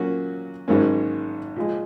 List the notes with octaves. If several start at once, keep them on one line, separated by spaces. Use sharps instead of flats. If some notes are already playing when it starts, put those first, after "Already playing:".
Already playing: A#2 F#3 A#3 C#4 F#4
G#1 G#2 F#3 A#3 C#4
A#2 F3 G#3